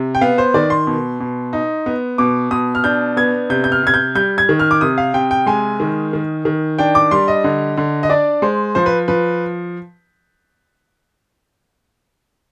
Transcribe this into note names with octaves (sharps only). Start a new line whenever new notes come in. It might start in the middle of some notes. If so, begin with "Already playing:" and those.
Already playing: C3
G5
B3 F5
C5
D#3 D5
C6
B2
B2
D#4
B3
B2 D6
B2 D#6
F6
D4 G6
B3 G#6
C3 G6
G6
F6
C3 G#6
G6
G3 G6
G#6
D#3
F6
D6
C3 D#6
F5
C3 G5
G5
G#3 G#5
D#3
D#3
D#3
D4 G5
D6
G3 C6
D#5
D3
D3
D#5
D4 D5
G#3 C5
F3 C5
B4
F3 B4